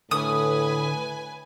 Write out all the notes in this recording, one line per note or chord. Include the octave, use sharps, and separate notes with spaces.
A2 D3 B4 G#5 D#6